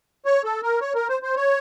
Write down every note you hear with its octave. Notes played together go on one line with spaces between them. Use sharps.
C#5
A4
A#4
C#5
A#4
C5
C5
C#5